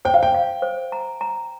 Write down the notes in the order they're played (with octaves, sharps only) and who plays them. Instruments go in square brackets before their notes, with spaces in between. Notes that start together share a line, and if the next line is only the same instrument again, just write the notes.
[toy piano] C5 [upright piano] G5
[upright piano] F5
G5
[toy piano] F5
C5
A#5
A#5